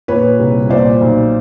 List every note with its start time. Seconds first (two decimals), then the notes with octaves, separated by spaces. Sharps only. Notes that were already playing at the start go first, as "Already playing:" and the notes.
0.08 A#2 B4 C#5
0.39 C2
0.69 A#2 C5 D5
1.01 B1